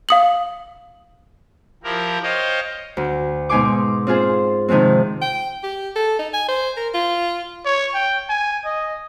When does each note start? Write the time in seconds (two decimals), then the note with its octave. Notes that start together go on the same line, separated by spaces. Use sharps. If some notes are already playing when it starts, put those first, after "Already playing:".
0.09 F5 D#6 F#7
1.83 F3 E4 G4 A#4
2.23 C5 C#5 D#5 F5 G5
2.97 D2
3.49 G#2 B2 D#4 G#5 C6 D6
4.07 C4 F4 G#4 C5
4.68 C3 D#3 F3 G#3 C4
5.22 G5
5.64 G4
5.96 A4
6.19 D#4
6.34 G#5
6.48 C5
6.77 A#4
6.94 F4
7.65 C#5
7.94 G5
8.29 G#5
8.65 D#5